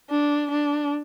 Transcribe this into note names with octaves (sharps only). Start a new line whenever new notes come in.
D4
D4